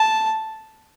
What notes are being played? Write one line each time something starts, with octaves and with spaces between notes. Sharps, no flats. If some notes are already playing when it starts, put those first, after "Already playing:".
Already playing: A5